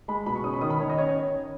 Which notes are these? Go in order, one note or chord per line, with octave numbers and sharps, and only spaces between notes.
G#3 B5
B2 B5
C#6
C#4 D#6
B5
D#3 D#6
B5
D#3 C#5
D#5
C#4 C#5